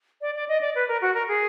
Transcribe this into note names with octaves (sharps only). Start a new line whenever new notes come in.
D5
D5
D#5
D5
B4
A#4
F#4
A#4
G#4